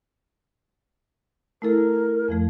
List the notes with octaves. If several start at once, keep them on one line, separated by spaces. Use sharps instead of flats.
A3 E4 A4 A#4
F2 F3 A3